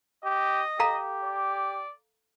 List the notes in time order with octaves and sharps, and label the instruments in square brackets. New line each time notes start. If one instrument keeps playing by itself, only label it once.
[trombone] G4 [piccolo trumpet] D#5
[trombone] G4 [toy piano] A4 F5 A#5
[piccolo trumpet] D5